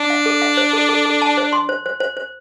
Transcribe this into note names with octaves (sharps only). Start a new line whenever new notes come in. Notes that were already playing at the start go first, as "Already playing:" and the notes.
Already playing: D4
F5
A4
F5
C5
A4
A4
A4
A5
C5
C6
C5
C5
C5
C5